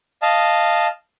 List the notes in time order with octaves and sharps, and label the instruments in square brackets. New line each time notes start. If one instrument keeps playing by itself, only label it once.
[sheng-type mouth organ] D#5 F5 A5